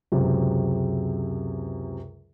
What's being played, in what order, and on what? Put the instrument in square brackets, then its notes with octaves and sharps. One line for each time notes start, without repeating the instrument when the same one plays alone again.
[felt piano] C#2 F#2 C3